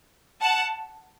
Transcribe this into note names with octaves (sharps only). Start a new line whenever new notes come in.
F#5 A5